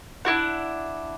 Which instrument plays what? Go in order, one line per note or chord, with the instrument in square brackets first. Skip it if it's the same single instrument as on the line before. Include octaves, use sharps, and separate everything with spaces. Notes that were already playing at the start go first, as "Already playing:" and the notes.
[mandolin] D4 E4 F#4 F#5